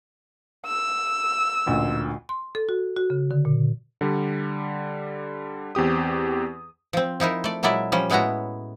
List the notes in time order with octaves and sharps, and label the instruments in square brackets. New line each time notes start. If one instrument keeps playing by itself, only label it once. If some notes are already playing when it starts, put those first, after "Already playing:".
[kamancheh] E6
[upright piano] A1 D2 A#2
[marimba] C6
A4
F#4
F#4
C#3
D3
A#2
[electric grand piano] D3 G3
E2 C4 G4 D#6
[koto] F3 C4
F3 D#4 E4 A#4
A3 D5
A#2 F#3 G#3 E4 D5 E5
F3 G3 C#4
A2 G#3 B3 E4 F#4 A#5